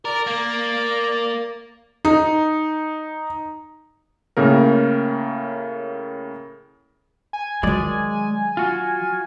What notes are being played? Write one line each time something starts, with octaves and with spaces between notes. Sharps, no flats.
A#4 D5
A#3 D5
D#4
A2 C#3 A#3 A#4
G#5
D#3 F#3 G#3 D5
F4 F#4